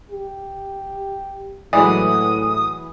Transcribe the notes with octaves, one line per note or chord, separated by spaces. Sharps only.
G4
A2 E3 F#3 G#3 D5 D#6